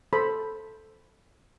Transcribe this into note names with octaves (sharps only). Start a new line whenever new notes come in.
A4 C5 B5